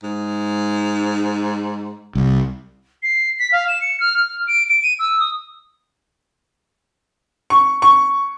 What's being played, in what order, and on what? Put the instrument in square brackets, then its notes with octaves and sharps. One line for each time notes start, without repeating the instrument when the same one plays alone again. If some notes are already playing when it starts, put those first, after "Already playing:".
[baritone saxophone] G#2
[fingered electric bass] C2
[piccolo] C7
B6
F5
E7
C#7
F6
F6
D7
D7
D#7
E6
D#6
[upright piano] C#6
C#6